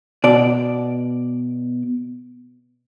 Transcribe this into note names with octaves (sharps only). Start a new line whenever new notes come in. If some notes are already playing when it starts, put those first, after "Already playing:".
B2 D5